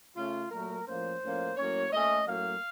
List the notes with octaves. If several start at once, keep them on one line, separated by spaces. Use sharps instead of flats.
C#3 A3 C#4 F4
A#2 F#3 A3 A#4
A2 F3 A#3 C#4 C5
A2 F3 A#3 C#4
A2 F#3 A#3 C#4 C#5
A#2 A3 C#4 D#5
A2 F#3 A#3 C#4 F5